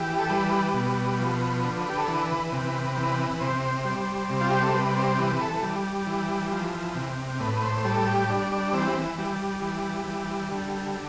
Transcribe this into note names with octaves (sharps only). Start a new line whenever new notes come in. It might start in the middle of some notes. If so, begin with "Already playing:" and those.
Already playing: E3 G4
A4
G3 B4
B2
F3
D3
G4
A4
E3 B4
C3
E3 B4
C3 C5
G3
C3
F4
G4
A4
G3 B4
C5
E3 B4
A4
G3
E3
F3
C3
A2 B4
C5
G3 A4
G4
G3 D4
D4
E3 C4
G3
E3
G3
D3